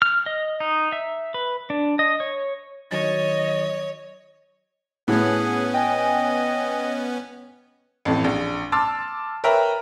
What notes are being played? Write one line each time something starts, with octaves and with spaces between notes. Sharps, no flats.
F6
D#5
D#4
E5
B4
D4
D#5
C#5
D#3 F#3 C#5 D#5 A6
A2 B3 C#4 G#4 F#5
D#5 G5 G#5
A1 F2 A2
A#1
A5 C6 D6 E6 F6 A6
A#4 B4 C#5 E5 G5 A#5